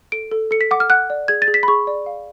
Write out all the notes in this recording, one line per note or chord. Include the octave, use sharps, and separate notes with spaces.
A4 D7
A4
A4 C#7
B6
F#5 D6
F6
F#5 F#6
D5
G#4 G#6
A6
G#4
B6
B5
G#4 C#6
D5
F5